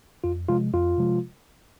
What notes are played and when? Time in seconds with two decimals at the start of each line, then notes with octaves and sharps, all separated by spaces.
0.24 F2 F4
0.49 C3 F3 G#3 F4
0.73 F2 F4
0.98 C3 F3 G#3